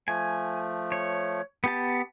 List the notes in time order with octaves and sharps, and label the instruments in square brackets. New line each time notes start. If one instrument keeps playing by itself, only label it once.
[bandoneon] F3 A3 [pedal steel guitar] G#5
[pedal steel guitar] C#5
B3 G4 A5